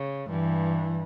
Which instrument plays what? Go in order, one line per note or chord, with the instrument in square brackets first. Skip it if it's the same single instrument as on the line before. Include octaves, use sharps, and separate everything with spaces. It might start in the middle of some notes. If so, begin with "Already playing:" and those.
Already playing: [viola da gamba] C#3
[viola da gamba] G2 [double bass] E3